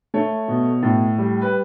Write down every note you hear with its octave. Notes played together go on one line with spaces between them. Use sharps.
A3 C#5
B2
A2
G3
B4